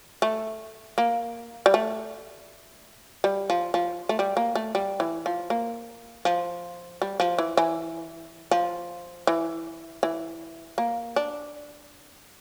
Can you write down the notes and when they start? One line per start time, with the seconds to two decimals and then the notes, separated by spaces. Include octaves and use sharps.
0.22 A3
0.98 A#3
1.66 G3
1.74 A3
3.24 G3
3.50 F3
3.74 F3
4.09 A3
4.19 G3
4.37 A#3
4.55 A3
4.75 G3
5.00 E3
5.26 F3
5.50 A#3
6.25 F3
7.02 G3
7.20 F3
7.39 E3
7.57 E3
8.51 F3
9.27 E3
10.03 E3
10.78 A#3
11.16 D4